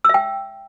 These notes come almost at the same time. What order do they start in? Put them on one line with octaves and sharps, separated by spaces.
E6 E5 G5